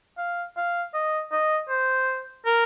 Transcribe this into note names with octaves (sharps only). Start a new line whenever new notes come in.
F5
F5
D#5
D#5
C5
A#4